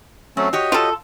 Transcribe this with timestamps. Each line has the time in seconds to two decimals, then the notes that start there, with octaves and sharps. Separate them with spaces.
0.37 F#3 A3 C4 C#4
0.53 F#4 G4 C#5 D#5
0.72 F4 A4